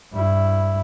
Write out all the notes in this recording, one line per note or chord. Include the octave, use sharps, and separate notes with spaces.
G2 E4